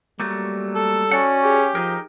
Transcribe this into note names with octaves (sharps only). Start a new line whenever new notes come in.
F#3 G3 A3 A#3
A4
C#4 F#4 D5 F#5
G4 G#4
F3 D#4 G#4 A#4